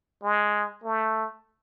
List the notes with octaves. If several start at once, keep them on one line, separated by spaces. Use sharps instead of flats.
G#3
A3